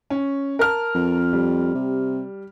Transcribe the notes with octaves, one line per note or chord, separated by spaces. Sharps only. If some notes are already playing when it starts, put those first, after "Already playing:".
C#4
A#4 A5 F6
F2
G3
C3